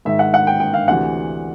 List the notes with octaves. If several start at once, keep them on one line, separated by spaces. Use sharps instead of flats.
G#2 D#3 E5
F#5
F#5
G5
G5
F5
D2 C3 E3 F#5